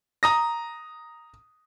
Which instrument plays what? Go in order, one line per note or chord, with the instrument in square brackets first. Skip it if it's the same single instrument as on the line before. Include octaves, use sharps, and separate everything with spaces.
[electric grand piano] A#5 D#6 A#6